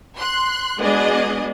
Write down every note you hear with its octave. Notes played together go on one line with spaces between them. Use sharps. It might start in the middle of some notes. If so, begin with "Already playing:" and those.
C6 F#6
G#3 B3 D4 F#4 G#4 D#5